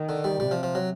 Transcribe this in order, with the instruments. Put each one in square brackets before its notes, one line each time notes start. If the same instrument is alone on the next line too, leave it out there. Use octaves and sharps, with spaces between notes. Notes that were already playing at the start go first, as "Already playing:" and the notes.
Already playing: [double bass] D#3
[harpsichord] D3
G3
[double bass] C3 [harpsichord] G3
[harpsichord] F3
F3
F#3